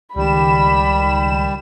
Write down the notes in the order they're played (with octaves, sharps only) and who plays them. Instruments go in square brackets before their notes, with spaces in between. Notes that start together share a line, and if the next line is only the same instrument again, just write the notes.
[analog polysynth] C#2 D#3 E7 [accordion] G3 [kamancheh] B5